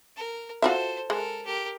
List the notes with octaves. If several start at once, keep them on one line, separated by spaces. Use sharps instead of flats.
A#4
F4 F#4 A4 C5 E5
G#3 A4 A#4
G4 A#4